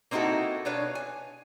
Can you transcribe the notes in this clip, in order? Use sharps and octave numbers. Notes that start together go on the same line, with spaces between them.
A#3 C4 D#4 E4 F#4 A4
B2 D4 B4 C#5 F5
G#5